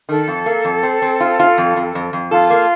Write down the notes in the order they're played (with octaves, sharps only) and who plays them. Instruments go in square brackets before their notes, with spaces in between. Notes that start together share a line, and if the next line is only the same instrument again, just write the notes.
[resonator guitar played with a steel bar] D#3 [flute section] A4
[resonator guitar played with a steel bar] F2
A#3
F2
C4
C4
F4
F4
F2
F2
F2
F2
[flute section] F4 [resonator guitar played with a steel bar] A4
[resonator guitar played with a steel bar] A#3